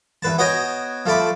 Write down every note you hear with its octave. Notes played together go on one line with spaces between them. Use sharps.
E2 B4 A5
B3 F#4 C#5 D#5 G5 G#5
F3 A3 D5 B5